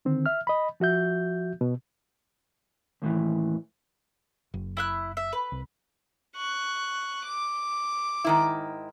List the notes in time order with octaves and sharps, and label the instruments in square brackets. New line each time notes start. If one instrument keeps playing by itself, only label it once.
[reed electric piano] D3 D#3 C4
E5 F6
D#5 B5
F3 F#4 E5 G6
B2
[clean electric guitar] D#2 A2 D#3 E3
[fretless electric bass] F#1
[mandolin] E4 E5 F#6
E5
B4
[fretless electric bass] C2
[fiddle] C#6 F#6
D6
[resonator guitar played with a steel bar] G#2 D#3 E4